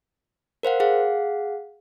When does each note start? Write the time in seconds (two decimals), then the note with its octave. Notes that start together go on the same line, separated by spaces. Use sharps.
0.63 A#4 C5 F5 F#5
0.80 G#4 F5 F#5